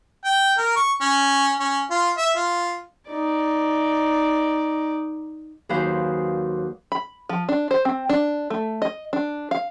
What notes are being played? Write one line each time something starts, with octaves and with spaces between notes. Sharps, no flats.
G5
A#4
C#6
C#4
C#4
F4
E5
F4
D#4 D5
D#2 F#3 G#4 B4 C5 F5
B5
F3
D4
C5
C4
D4
A3
D#5
D4
F5